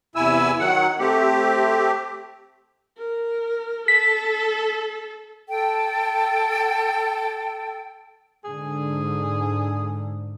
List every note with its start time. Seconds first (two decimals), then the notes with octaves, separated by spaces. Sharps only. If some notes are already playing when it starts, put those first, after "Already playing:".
0.15 E2 C3 E4 G#5 E6
0.59 D#3 F#3 F#5
0.99 A3 C4 G4
2.98 A#4
3.88 A4 B6
5.48 A4 G5
8.44 G#2 D3 G#4